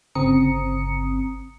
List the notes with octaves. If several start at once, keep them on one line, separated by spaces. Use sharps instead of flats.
G1 C#3 C4 A#5 D#6 C#7